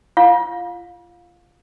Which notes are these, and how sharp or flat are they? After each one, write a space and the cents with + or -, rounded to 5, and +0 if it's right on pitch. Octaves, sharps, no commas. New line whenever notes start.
F4 -30 F5 +25